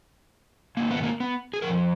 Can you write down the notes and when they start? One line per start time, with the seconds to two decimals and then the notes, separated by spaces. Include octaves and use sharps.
0.77 G#2 D#3 A#3
0.90 B3
1.03 A#3
1.20 B3
1.53 G#4
1.62 C#3 F3 A#4
1.67 F2